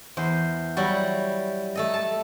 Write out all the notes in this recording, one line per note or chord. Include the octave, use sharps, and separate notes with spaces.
E2 C5
F#3 G3 E4 F#4
A3 A4 D#5
A5